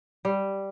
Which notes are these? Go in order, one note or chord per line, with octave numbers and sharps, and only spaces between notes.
G3